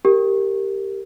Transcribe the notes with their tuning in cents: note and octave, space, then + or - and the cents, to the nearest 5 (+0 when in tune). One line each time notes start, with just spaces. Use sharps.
G4 +0 A#4 -15